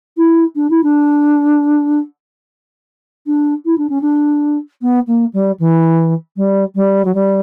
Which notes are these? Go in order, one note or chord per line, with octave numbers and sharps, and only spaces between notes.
E4
D4
E4
D4
D4
E4
D4
C#4
D4
B3
A#3
G3
E3
G3
G3
F#3
G3